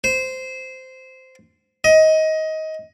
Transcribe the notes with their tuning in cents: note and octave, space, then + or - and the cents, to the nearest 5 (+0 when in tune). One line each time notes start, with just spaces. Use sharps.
C5 -10
D#5 +20